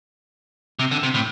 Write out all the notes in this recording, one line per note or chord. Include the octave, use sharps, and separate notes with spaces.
C3
D3
C3
A2